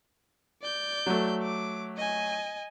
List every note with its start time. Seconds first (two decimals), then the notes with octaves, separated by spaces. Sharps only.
0.62 D5 G6
1.06 F#3 A3
1.43 D6
1.97 D#5 G#5